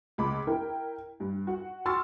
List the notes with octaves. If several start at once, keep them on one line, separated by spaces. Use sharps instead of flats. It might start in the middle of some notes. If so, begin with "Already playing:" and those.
C#2 B5 D6
E4 A#4 G5
G2
F#4 F#5
F#4 C6 C#6 E6 F6 A6